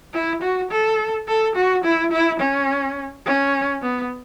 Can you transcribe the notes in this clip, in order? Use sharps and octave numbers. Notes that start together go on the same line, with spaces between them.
E4
F#4
A4
A4
F#4
E4
E4
C#4
C#4
B3